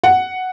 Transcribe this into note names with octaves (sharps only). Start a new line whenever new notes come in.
F#5